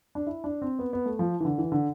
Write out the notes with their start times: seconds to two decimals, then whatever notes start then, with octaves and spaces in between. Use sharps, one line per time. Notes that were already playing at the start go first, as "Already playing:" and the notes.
0.15 D4
0.27 E4
0.44 D4
0.62 C4
0.79 B3
0.93 B3
1.06 A3
1.19 F3
1.41 E3
1.45 D3
1.58 E3
1.72 D3